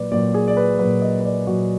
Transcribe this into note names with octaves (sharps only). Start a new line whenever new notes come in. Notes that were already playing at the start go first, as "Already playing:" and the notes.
Already playing: A#2 F#3 B4 D5
A#2 F#3 D5
G#4
D5
B4
A#2 F#3 B4
D#5
B4
D5
A#2 F#3 F#4